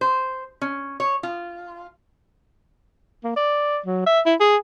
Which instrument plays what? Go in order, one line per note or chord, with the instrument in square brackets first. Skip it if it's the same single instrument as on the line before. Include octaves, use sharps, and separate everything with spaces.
[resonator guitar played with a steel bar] C5
C#4
C#5
F4
[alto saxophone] A#3
D5
F#3
E5
E4
G#4